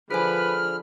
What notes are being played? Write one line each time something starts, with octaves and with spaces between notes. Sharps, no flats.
D3 F3 G#4 B4 C5 G#5 B5 F6